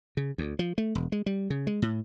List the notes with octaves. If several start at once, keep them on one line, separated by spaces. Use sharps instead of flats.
C#3
D2
F3
A3
E1
G#3
G3
C#3
G#3
A2